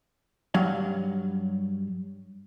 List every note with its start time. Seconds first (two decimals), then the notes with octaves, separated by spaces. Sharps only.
0.54 G2 F#3 C#5 F5